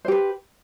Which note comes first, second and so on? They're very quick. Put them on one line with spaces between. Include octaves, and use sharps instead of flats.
C5 G4 B4